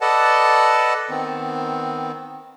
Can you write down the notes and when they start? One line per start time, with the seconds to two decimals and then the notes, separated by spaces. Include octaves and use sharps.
0.01 A4 B4 D5 D#5 F#5 A5
1.10 D#3 B3 C4